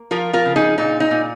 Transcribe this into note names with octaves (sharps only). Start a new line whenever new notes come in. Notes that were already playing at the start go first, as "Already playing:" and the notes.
Already playing: A#3
F3 F4 A#4
F4 A#4
C#3
D#4 G#4
A#2 D#4
D#4
A#2